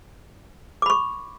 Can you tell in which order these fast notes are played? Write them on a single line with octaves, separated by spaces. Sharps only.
D6 B5 C#6